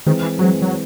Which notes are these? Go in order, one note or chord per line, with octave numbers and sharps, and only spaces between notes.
D#3 E3 G#3 C4
E3
E3 F#3 G#3 C4
F#3